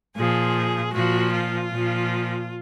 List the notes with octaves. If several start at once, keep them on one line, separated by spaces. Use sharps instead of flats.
A#2 F3 G#4
A#2 F3 F#4
F4
A#2 F3